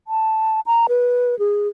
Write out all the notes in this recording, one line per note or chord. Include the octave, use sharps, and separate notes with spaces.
A5
A#5
B4
G#4